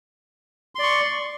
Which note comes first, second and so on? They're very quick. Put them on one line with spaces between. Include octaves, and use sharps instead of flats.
C6 D5 C#6